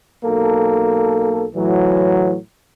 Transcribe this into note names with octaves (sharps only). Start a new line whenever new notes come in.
B1 A#3 A4
A2 E3 F#3